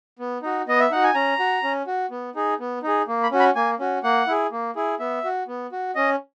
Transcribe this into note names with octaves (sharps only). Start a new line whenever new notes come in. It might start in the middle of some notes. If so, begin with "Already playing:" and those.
B3
D#4 F#4
B3 D#5
E5
D#4 F#4 F#5
G#5
C#4 A#5
F#4
C#4
F#4
B3
D#4 G#4
B3
D#4 G#4
A#3
B5
C#4 F#4
B5
A#3 G#5
C#4 F#4
A#3 F#5
E4 G#4
A#3
E4 G#4
B3 E5
F#4
B3
F#4
C#4 D#5